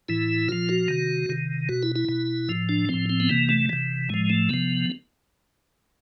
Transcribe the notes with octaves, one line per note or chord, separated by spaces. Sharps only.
A2 E3 E4
A#2 F3 F4
F#4
C3 D#3
C3 D#3
B2 F#4
E4
E4
B2
A2 F3
D4
A2 F3 C4
C4
B3
C3 E3 A#3
A3
C3 E3
A2 F3 G#3
A3
C3 F3 B3